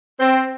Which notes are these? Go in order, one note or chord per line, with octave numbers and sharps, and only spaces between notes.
C4